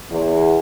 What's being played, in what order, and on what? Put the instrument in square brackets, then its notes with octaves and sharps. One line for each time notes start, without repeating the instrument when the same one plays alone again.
[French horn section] E2